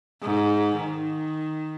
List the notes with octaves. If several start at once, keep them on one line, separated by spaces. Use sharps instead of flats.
G#2
D#3